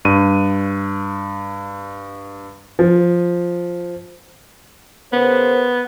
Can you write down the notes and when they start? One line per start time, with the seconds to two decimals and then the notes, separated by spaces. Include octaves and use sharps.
0.05 G2 D#7
2.79 F3
5.13 C#3 B3 A#4 C5